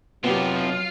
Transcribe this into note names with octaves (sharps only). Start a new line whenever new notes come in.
C3 F3 F#3 B3 F4 G4